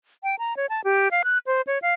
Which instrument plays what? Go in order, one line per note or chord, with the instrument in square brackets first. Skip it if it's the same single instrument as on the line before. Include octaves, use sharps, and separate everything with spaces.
[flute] G5
A#5
C#5
A5
G4
F5
F#6
C5
C#5
F5